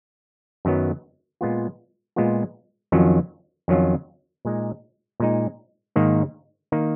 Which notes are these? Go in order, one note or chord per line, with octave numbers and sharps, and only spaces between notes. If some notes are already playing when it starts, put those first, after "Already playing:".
F#2 D#3 F#3 B3
A#2 G#3 B3 F4
A#2 G#3 B3 F4
F2 D#3 F#3 C#4 F4
F2 D#3 F#3 C#4 F4
A#2 G#3 D#4
A#2 G#3 D#4
G#2 D#3 A#3 D#4
D#3 A#3 D#4